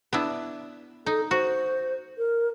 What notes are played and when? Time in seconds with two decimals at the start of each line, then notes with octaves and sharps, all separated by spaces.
0.13 B3 D4 E4
1.06 D#4 A4
1.31 F#4 C5
2.18 A#4